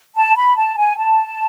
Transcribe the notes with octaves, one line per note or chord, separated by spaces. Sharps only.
A5
B5
A5
G#5
A5